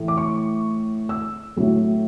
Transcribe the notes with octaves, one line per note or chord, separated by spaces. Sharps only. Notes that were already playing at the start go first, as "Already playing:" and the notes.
Already playing: A2 E3 A3
D6
C#6
E6
A2 F#3 A3